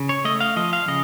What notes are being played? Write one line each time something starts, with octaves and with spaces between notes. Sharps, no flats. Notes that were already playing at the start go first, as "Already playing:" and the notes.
Already playing: C#3
C#5
A3 D#5
F5
F3 D#5
F5
C#3 D#5